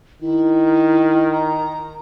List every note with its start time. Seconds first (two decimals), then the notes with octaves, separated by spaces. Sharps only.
0.22 D#3 E4
1.32 A#5